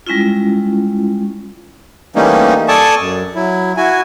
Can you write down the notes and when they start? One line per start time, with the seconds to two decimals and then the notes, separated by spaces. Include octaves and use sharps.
0.07 G3 G#3 C#4 E4 F4
2.16 E3 G3 A3 A#3 C#4 D#4
2.68 A4 D5 G#5 A5 C#6 D#6
2.99 F#2
3.35 F#3 E4
3.77 E4 F#4 G#5